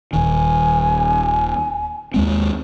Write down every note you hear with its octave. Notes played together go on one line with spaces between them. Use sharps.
D#1 D#3 G#5
D#2 G#3 C4